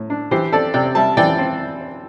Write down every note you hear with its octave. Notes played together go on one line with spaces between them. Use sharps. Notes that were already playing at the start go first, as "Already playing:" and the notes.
Already playing: A2
D4
E3 G4 C5
C4 A4 D5
C3 D5 G5
G3 E5 A5
E3 D5 G5
C4